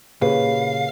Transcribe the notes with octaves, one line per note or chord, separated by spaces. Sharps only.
A#2 C#3 A#3 G4 G#4 B4 C#5 F5